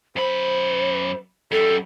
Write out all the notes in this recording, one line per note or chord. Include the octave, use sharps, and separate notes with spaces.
F#2 C5 B5
F#2 G3 A4